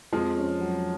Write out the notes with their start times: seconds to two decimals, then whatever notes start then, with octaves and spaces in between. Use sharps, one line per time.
0.13 F2 F3 G#3
0.37 C#4
0.61 F#3